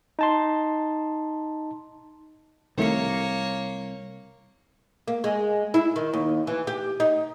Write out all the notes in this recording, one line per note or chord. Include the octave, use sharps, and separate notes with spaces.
D#4 A5 C6
C2 D#3 A3 A#3 C#5 C#7
A#3
G#3
E4
D#3
D#2
E3
G4
D#4